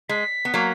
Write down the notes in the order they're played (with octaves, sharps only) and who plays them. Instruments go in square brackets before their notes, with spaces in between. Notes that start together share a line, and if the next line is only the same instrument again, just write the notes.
[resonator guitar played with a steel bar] G#3 [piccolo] B6
[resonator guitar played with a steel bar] B3
F#3 A#3